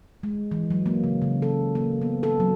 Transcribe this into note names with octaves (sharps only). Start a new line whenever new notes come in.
G#3
E3
F#3
A#3
C#3
C#3
A4
A#3
B3
A4
F#3